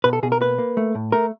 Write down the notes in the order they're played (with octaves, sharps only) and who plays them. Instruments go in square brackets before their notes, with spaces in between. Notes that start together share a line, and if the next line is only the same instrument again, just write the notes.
[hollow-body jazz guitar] B2 B4
A4
B2 G#4
A#4
A#3 B4
A#3
A3
A2
A3 A#4